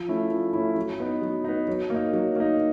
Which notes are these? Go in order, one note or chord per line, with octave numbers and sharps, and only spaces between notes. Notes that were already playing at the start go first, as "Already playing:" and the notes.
Already playing: F3
A3 C#4 E4
F3
A3 C#4 E4
F#3
B3 D#4
F#3
B3 D#4
F#3
A#3 D#4
F#3
A#3 D#4